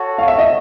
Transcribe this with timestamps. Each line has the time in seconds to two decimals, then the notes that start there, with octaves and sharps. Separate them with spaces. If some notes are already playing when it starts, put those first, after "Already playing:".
Already playing: F#4 A4 C#5
0.18 F5
0.28 E5
0.38 D#5